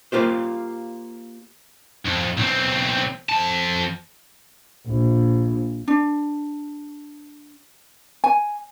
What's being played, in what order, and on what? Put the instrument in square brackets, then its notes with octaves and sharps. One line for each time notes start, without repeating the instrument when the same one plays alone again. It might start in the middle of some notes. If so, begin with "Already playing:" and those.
[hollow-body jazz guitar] A#3 F4 G4 C5
[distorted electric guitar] F2
B1 C4
F2 A5
[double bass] A#1
[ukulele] D4
G#5